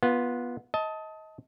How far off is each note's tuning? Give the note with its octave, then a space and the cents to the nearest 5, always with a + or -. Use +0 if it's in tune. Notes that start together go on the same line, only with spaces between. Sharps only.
B3 -15 F4 +0
D#5 +25 A5 +0